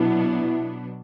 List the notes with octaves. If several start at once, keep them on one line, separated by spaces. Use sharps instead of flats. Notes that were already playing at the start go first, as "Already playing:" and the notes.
Already playing: B2 F#3 B3 D4 E4